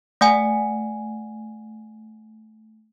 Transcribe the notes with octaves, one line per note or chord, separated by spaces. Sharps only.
A3 F#5 G#5